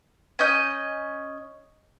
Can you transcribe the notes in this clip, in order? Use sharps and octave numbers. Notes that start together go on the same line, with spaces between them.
C#4 D#5 G6